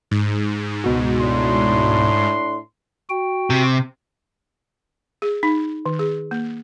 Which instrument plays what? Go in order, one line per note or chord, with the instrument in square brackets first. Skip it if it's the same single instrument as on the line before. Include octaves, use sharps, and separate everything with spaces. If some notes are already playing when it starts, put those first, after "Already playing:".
[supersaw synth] G#2
[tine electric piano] C#2 B2 F#4
[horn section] A2 D4 C6
[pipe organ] F#4 G5
[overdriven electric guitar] C3
[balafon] G#4
D#4
D#3
G#4
A#3